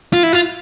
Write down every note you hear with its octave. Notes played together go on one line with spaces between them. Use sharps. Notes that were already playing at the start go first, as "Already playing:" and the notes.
F4
E4
F4